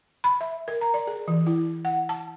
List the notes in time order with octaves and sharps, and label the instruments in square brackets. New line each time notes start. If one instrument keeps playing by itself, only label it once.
[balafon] B5
E5
A#4
A#5
D5
G#4
E3
E4
F#5
A5